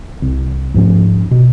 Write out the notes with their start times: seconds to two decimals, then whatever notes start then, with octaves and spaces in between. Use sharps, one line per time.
0.22 C2
0.74 D2 G#2 F3 C#4
1.31 B2